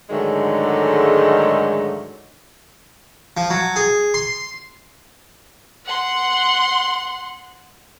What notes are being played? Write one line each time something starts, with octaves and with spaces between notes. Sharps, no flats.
G#2 D3 D#3 F#3 G#3 A3
F3
F#3
G#4
C6
F#5 C6